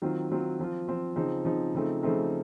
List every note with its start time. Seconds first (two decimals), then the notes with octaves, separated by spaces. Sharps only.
0.02 D#3 F#3 C4 F4
0.31 D#3 F#3 C4 F4
0.60 F3 C4 F4
0.87 F3 C4 F4
1.16 C#3 F3 C4 D#4
1.45 C#3 F3 C4 D#4
1.74 C#3 F3 A3 C4 D#4
2.03 C#3 F3 A3 C4 D#4